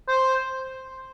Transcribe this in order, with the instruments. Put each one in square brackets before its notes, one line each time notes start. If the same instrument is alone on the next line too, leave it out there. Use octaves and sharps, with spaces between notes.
[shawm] C5